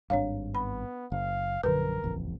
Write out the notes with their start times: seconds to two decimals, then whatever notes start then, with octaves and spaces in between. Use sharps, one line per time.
0.10 G#1 G2 D4 C#5 F5
0.55 B3 B5
1.12 F#1 F5
1.63 A#1 F#2 D3 A#4 B4
2.02 D#1 A1 F2